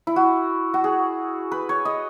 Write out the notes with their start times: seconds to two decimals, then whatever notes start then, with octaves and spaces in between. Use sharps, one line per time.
0.07 E4
0.16 F#4
0.74 F#4
0.84 G#4
1.52 B4
1.69 C#5
1.85 D#5